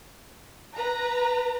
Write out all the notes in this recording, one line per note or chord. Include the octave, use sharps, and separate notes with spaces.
B4 A#5